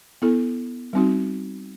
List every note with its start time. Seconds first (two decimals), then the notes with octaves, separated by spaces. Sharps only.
0.22 B3 E4 A4
0.93 G3 C4 D#4 F#4